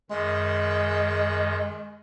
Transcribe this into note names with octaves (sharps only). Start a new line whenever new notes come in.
F#2 D#3 G#3